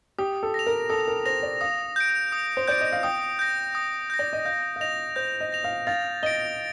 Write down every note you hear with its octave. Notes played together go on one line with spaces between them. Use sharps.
G4 D#6
A4
A#6 F7
A#4
A4 D#6
A#4
C5 A#6 F7
D5
F5 D#6
G6 D7
D#6
C5
D5 G6 D7
D#5
F5
G5 D#6
G6 A#6
D#6
G6 A#6
D5
D#5
F5 G6
F5
D#5 A#6 F7
C5 G6
D#5
A#6 F7
F5
F5 A6
D#5 D7 G7